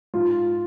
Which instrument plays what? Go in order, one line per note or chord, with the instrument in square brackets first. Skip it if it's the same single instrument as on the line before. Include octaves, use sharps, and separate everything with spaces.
[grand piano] G#2 F4